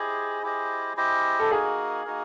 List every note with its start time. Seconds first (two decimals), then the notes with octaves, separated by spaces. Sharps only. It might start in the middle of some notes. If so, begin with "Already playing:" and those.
Already playing: E4 G4 G#4 C5 D#5
0.43 E4 G4 C5 D#5
0.97 E4 G4 C5 D#5
1.40 A4
1.51 A#3 D#4 F#4 G#4 A#4
2.05 A#3 D#4 F#4 A#4